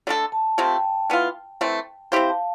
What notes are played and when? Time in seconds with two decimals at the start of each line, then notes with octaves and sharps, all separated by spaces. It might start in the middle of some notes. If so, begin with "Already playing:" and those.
0.07 D3 A3 D4 A4
0.32 A5
0.58 C3 F3 A3 C4 G5
1.10 E3 B3 F4
1.61 E3 A3 C4
2.12 C4 E4 G4 C5 F5
2.29 A5